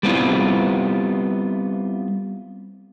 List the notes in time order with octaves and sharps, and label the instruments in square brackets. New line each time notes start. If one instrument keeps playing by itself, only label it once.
[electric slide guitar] G3 B3 C4 E4 F4